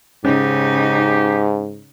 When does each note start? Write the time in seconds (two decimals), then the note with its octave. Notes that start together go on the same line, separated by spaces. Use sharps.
0.25 G#2 C#3 C#4 D#4 G4